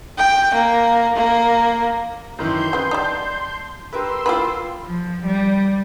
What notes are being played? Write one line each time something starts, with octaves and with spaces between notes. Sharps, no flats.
G5
A#3
A#3
F#2 D#3 E3 C6 G6
C#3 C4 B4
G3 D#4 D5 A5
G4 A#4 B4 C6 E6
A#3 E4 F4 B4 G5
F3
G3